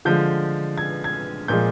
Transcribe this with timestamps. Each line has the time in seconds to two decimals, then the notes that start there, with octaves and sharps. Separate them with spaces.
0.05 D3 F3 G#3 G6
0.78 G#6
1.04 G#6
1.48 A#2 F3 G#3 G6